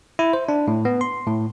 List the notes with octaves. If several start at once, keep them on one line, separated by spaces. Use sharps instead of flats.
E4
C5
D4
A2
B3
C6
A2